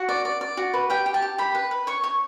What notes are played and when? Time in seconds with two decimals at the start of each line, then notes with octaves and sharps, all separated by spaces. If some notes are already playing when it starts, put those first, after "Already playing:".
Already playing: F#4 F#5
0.09 D5
0.25 D5
0.41 D5
0.57 F#4
0.74 B4
0.90 G4 G5
1.06 G4
1.14 A5
1.22 G4
1.38 G4 B5
1.55 B4
1.71 B4
1.87 C#5 C#6
2.04 C#5